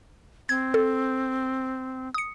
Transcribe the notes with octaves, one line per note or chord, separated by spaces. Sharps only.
C4 G#6
A4
D#6 C#7